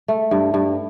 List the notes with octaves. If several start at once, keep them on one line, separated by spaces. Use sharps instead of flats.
A3
G2
G2